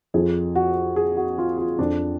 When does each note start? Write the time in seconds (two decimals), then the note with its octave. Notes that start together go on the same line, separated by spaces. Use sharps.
0.14 F2 F3 G#4
0.55 F#4
0.96 G#4
1.17 F#4
1.38 F4
1.58 F4
1.79 F2 F3 D4